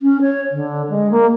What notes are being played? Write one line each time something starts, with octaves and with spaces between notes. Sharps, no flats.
C#4
C#5
D3
G#3
A#3